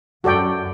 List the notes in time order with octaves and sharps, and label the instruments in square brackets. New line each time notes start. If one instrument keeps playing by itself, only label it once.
[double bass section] F#2 [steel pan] F#4 A4 D5 G5